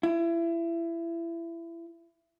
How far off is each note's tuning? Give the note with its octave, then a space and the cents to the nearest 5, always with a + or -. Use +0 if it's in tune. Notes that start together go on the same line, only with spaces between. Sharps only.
E4 +25